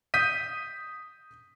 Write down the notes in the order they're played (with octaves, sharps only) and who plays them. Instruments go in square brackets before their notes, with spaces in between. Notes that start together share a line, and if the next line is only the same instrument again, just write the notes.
[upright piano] D#6 G6 B6 D#7